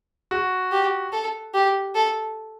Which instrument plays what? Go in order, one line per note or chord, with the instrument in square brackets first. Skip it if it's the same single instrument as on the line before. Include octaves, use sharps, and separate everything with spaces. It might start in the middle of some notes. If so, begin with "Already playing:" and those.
[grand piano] F#4
[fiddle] G4
A4
G4
A4